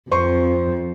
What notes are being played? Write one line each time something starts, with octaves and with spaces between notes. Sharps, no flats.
F2 C5 C6 C#6